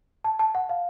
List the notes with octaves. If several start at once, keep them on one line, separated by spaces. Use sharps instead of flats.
A5
A5
F#5
F5